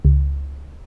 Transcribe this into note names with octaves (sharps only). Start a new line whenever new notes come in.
C#2